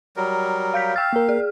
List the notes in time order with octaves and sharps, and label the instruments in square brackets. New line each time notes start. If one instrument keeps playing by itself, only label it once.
[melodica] F#3 G3 A#4
[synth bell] F5 G6 B6
[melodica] F5 [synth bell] G5 E6 F6 [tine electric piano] A6
[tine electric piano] A#3 A#4
[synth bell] G#4